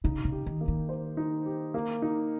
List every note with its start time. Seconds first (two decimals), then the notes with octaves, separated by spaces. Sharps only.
0.04 C#3 D#4
0.25 C#3
0.32 G4
0.46 D#3
0.61 A#3
0.68 D#3
0.89 C5
1.17 D#4
1.46 G4
1.74 A#3
2.02 D#4